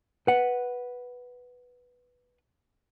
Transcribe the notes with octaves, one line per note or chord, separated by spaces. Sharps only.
B4 F#5